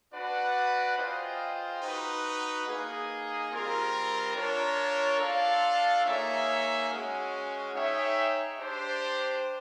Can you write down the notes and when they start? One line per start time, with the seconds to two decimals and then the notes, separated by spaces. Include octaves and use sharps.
0.12 D4 F#4 B4 D5 F#5
0.97 F4 G#4 C5 D#5 G5
1.81 D#4 F#4 B4
2.66 A#3 D#4 G#4
3.51 G3 C4 F4 A#4
4.35 D4 F4 A#4 C#5
5.20 D4 F4 A4 D5 F5
6.04 A#3 D#4 G#4 C#5 E5
6.88 G#3 C#4 F#4
7.73 D#4 G#4 C#5 E5 G5
8.59 D4 G4 C5